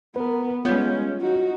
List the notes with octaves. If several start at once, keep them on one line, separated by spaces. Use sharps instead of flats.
B3 A#4 B4
G3 G#3 B3 C#4 F4 C#5 G6
D#4 F#4